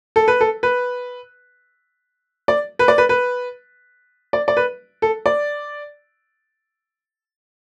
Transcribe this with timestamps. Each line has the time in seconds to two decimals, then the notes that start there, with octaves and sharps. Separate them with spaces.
0.16 A4
0.28 B4
0.41 A4
0.63 B4
2.48 D5
2.79 B4
2.88 D5
2.98 B4
3.09 B4
4.33 D5
4.48 D5
4.57 B4
5.02 A4
5.26 D5